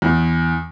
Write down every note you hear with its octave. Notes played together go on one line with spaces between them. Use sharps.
E2